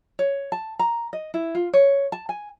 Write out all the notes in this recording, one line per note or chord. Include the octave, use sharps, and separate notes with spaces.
C#5
A5
A#5
D#5
E4
F4
C#5
A5
G#5